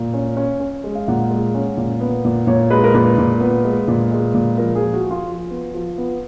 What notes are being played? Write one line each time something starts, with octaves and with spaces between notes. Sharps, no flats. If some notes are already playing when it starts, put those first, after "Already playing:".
Already playing: A#2
C#4
C#4
C#4
G#3
F5
A#2 F#5
G#3
C#4
A#2
B3
A#2
A#2 C#5
G#3 B4
A#4
A#2 B4
A#2
B3
G#3
A#2
G#3
A#2
F3 A#4
G#4
F3
F#4
F3
F4
F3
B3
F3
B3